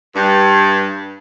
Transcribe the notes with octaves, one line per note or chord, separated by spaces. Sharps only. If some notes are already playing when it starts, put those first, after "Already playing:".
G2